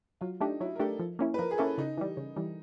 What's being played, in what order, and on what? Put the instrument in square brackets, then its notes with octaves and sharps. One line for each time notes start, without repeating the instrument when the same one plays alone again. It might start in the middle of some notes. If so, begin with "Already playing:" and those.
[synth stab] F#3 [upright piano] F4
[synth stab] A3 D4 G4 [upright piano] D#4
[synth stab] F#3 [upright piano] E4
[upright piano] A#4
[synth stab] A3 D4 G4 [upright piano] A4
[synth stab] F3
A#3 C#4 E4
[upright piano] B4
[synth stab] F3 [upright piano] A#4
[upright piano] G#4
[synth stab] A#3 C#4 E4 [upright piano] A4
[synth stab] C#3 [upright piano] D#4
[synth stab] E3 G3
C#3
E3 G3